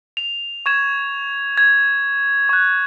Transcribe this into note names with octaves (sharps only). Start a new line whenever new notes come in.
F7
C#6 G#6 E7
G#6
C#6 F#6